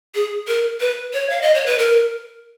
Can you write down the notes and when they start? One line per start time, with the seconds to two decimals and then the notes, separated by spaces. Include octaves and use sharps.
0.15 G#4
0.48 A#4
0.80 B4
1.13 C#5
1.30 F5
1.42 D#5
1.54 C#5
1.66 B4
1.78 A#4